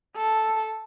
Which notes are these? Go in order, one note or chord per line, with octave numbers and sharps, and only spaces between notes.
A4